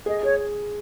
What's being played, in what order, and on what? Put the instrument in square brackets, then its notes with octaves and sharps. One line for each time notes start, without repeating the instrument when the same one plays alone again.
[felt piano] G#4 [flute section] D#5
[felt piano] G#4 [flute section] C#5